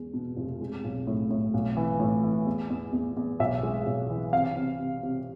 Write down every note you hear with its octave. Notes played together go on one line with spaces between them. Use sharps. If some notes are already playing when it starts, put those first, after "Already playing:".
Already playing: E2 G#3
B2
F1
G#3
B1
A2
A2
B1
E3
A2
E3
E2
E2
E2
E2
B1 E5
G#3
B1
E3
C3 F5
C3
C3
C3